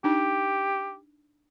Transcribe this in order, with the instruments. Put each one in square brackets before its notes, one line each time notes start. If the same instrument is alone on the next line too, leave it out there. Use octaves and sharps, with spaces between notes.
[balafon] D4 D#4 [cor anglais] G4